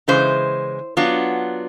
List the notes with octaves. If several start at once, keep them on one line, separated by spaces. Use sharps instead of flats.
C#3 E3 G#3 C5
F#3 B3 D4 F4